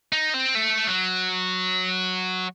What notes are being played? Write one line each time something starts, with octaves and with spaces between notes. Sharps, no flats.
D#4
C4
A3
F#3